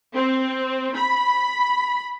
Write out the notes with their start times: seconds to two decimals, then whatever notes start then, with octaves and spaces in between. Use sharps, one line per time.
0.14 C4
0.96 B5